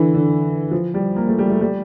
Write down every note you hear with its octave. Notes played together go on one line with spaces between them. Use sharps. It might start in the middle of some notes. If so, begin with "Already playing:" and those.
Already playing: D3 E3
D3
F3
G3
A#3
A3
G3
A3
G3